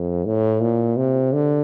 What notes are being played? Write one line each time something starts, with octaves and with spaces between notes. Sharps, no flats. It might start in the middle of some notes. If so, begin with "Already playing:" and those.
Already playing: F2
A2
A#2
C3
D3